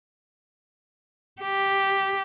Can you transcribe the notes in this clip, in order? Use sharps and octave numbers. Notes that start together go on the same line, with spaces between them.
G4